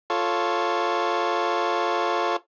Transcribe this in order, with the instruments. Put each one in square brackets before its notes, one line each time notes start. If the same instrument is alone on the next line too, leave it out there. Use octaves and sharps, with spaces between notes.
[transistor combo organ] F4 A4 C#5